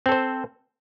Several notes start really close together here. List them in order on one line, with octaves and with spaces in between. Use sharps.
C4 A4 C5